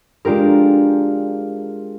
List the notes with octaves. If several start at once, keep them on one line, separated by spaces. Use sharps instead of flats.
G#3 D4 F4 G4 A#4